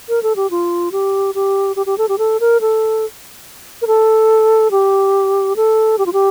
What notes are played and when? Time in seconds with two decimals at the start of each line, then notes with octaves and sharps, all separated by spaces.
0.09 A#4
0.23 A4
0.36 G4
0.51 F4
0.92 G4
1.35 G4
1.76 G4
1.86 G4
1.98 A4
2.09 G4
2.18 A4
2.40 A#4
2.61 A4
3.82 A#4
3.87 A4
4.71 G4
5.56 A4
5.98 G4
6.06 F4
6.13 G4